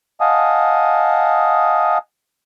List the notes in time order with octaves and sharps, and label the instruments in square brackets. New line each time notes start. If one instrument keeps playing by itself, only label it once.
[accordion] D#5 F5 F#5 G#5 A5 D#6